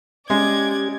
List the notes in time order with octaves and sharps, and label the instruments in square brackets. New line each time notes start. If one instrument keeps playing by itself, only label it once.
[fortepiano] G#3 [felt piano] C#4 [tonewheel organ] G4 [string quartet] D5 G#6